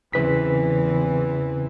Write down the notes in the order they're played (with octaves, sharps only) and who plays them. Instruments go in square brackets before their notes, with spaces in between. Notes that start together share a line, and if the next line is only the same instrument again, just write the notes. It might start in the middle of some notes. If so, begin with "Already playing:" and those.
[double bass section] E2 E3 C4 [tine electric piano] C#3 B4 B6